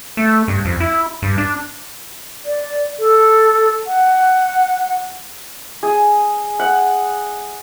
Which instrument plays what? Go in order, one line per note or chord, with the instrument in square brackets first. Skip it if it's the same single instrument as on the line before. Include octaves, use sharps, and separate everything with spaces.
[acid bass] A3
G2
F2
E4
G2
D4
[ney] D5
A4
F#5
[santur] G#4
F#5